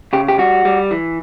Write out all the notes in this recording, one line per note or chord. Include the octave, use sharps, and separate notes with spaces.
C#3 G4
G4
G3 F#4
G3
E3